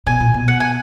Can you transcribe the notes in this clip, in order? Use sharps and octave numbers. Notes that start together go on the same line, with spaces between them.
B2 G#5
A#2
B2
F#5
G#5